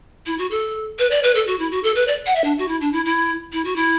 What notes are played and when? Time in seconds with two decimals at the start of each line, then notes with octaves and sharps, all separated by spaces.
0.26 E4
0.38 F#4
0.50 A4
0.99 B4
1.10 D5
1.23 B4
1.35 A4
1.47 F#4
1.59 E4
1.71 F#4
1.83 A4
1.95 B4
2.07 D5
2.26 F#5
2.35 E5
2.44 D4
2.58 F#4
2.68 E4
2.81 D4
2.92 E4
3.05 E4
3.52 E4
3.64 F#4
3.76 E4